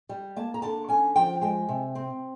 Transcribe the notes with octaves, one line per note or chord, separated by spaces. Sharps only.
G3
A#3 A5
A#5
D3 A5
C#4 G#5
F3 G5
G#3 G5
C3
C4